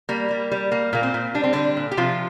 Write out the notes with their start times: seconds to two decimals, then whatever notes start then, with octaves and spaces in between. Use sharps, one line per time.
0.09 G3 A#3
0.31 G3
0.51 G3
0.72 G3 A#3
0.93 A#2 A#3
1.03 C4
1.14 A#2
1.34 G3 D4
1.44 C4
1.53 D3 G3 D4
1.77 A#2
1.91 G4
1.97 C3 F3 F4